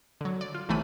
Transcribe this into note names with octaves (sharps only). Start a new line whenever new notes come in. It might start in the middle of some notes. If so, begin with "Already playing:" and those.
D3 F#3
D5
F4
B1 C3 E3 A3 B5 D#7